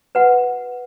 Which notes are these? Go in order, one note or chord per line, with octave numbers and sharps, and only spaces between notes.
F#4 B4 F#5